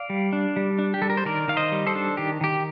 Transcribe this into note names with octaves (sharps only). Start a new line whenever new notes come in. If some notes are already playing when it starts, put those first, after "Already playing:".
Already playing: D5 F5
G3
D4
G3
D4
G4
G3 A4
A#4
C5
D#3 A#4 D5
D#3 F5
C5 D#5
G3
A4 C5
D4
D#3 G4
D#3 G4